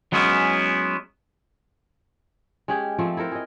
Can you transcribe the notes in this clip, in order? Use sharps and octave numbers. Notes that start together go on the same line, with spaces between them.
F#3 G#3 B3 C#4 E4
G#3 C#4 G4 G#4
F3 A3 C4
E4 A4 A#4 C5
G#4 D#5